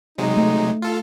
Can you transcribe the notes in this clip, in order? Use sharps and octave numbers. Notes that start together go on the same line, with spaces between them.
C3 F#3 G#3 D#4
A3
F4 A4